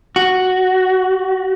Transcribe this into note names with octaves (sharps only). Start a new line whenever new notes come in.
F#4